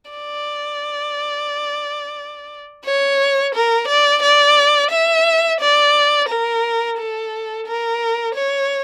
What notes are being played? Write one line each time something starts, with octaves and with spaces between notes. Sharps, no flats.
D5
C#5
A#4
D5
D5
E5
D5
A#4
A4
A#4
C#5